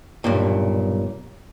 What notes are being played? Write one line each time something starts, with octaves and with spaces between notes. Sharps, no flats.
B1 G2 A#2